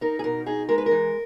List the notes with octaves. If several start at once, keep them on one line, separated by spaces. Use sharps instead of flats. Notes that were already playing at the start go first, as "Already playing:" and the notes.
D#4 A#4
G#4
B2 A#4
D#4 G#4
G#3 A#4
B4
A#4
E3